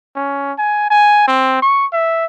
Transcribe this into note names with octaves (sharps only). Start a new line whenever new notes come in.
C#4
G#5
G#5
C4
C#6
E5